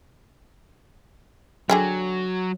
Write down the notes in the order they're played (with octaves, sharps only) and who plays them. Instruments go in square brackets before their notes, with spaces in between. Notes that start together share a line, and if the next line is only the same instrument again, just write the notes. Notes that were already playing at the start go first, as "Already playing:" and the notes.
[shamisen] D3 G#4 G5 [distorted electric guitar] F#3